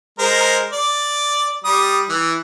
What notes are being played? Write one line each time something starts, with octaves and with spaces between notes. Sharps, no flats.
G#3 A#4 C5
D5
G3 D#6
E3